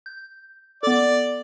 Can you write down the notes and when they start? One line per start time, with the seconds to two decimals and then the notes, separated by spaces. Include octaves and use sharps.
0.06 G6
0.83 B3 A4 D5